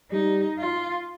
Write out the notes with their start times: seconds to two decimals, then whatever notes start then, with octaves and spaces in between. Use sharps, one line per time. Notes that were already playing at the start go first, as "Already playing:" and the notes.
0.11 G3 D#4
0.59 F4